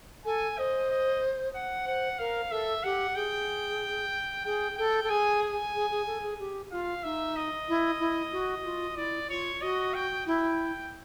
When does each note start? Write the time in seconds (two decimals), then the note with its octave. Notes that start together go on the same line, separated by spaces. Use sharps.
0.25 A4 G#5
0.58 C5 D#5
0.91 D#5
1.55 F#5
1.86 C5 F#5
2.19 A#4 F5
2.51 A4 E5
2.84 G4 F#5
3.15 G#4 G5
4.45 G#4 G5
4.77 A4 G5
5.04 A4
5.09 G#4 G#5
5.43 G#5
5.75 G#4
5.91 G#4
6.07 A4
6.23 G#4
6.39 G4
6.72 F4 F5
7.03 D#4 E5
7.36 D#5
7.69 E4
8.00 E4
8.32 F#4
8.64 F4
8.96 E4 D5
9.29 F4 C#5
9.61 F#4 D#5
9.94 G5
10.26 E4 G5